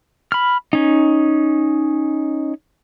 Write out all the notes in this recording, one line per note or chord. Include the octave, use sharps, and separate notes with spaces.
B5 F6
C#4 D#4